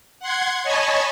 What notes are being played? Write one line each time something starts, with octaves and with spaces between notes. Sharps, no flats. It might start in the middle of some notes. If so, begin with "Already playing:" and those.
F#5 C6 G#6
C#5 D#5 G#5 A5 B5 C#6